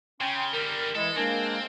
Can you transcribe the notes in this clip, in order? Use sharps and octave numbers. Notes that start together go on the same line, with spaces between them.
C#3 C#4 G5 C6
D3 G3 A#4
E3 G#3 E4 A4
G#3 A#3 C4 D4 A#4 G#5